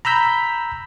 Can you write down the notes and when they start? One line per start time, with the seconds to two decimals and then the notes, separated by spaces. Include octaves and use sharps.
0.05 A#5 B5 E6 G6 B6